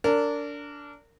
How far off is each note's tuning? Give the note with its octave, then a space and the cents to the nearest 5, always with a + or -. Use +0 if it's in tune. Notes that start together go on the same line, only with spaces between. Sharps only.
D4 -20 A#4 -30